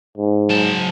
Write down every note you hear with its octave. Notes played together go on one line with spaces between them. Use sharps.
G#2
F#3 A5